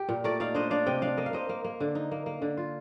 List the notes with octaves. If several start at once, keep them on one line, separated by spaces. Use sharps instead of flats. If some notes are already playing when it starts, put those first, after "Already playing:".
Already playing: G4
A#2
A3 A#4 D5
D#4 D5 F5
D4 C5 D#5
D4 D5 F5
C3 D#5 G5
D4 D5 F5
A#3 D#5
F5
A#3 C5 D#5
A#3
A#3
D3
D#4
A#3
A#3
D3
F4